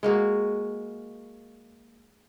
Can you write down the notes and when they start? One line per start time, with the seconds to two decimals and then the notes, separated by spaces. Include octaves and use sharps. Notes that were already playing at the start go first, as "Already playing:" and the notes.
0.03 G#3 A#3 F#4